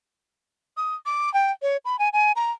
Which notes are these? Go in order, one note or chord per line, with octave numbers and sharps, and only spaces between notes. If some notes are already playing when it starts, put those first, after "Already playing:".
D#6
D6
G5
C#5
B5
G#5
G#5
A#5